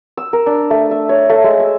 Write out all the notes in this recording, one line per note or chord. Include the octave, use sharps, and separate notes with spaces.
E6
A#4
D4
A3
E5
C#5
A3
G#3
E6